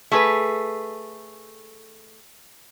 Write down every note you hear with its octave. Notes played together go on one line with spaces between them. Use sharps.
A3 G#4 B4